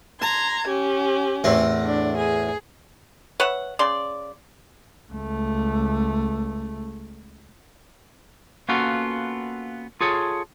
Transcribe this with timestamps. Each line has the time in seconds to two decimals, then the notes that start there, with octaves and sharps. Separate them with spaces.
0.22 A5 A#5 C6 G#6
0.66 C#4 G4
1.44 E2 A2 C4
1.86 D4
2.18 G#4
3.40 B4 C#5 E5 F#5
3.79 C#3 D5 C6
5.12 C#2 A3
8.69 A#3 B3 C#4 F4 F#4 A4
10.01 F4 G#4 A4 C#5